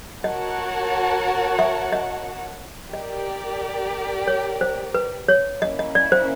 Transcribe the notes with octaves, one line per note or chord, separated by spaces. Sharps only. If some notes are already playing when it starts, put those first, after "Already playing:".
F#4 A#4 C#5 D#5 F#5 A5
E5
D#5
G4 A#4 D5 D#5
C#5
C5
B4
C#5
A#3 C#4 E4 D#5
D#5
D5
C5